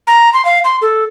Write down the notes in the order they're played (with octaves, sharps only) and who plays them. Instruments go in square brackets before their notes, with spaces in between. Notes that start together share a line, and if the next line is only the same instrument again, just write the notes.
[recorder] A#5
C6
F5
C6
A4